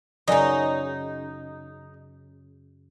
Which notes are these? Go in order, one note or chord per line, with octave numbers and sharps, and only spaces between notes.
F#2 C#3 D#4 D5 G#5 A#5